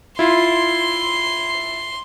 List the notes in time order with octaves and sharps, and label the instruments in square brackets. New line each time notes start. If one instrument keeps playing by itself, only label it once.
[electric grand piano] E4 F4 [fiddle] C6